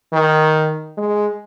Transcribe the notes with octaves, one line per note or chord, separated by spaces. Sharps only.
D#3
G#3